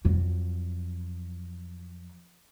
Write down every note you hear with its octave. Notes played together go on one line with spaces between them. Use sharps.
F2 F#3